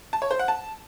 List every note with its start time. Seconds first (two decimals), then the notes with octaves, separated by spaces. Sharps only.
0.13 A5
0.22 C#5
0.31 C5
0.39 F#5
0.48 A5